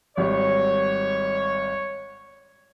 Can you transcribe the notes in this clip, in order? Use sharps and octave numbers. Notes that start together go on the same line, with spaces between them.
G#1 G3 C#5